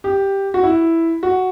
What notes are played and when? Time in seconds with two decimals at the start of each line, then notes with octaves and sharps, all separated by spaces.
0.04 G4
0.54 F#4
0.64 E4
1.23 F#4